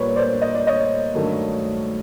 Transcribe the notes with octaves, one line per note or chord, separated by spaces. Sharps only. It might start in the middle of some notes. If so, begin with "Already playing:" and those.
Already playing: A#2 G3 A#4 B4 C#5 D5
C5 D5
D#5
D5
C#5 D#5
G2 D#3 F#3 A3